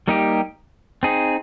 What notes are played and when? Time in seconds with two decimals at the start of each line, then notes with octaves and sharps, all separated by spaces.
0.08 G3 A#3 D#4 G4
1.03 C4 D#4 G#4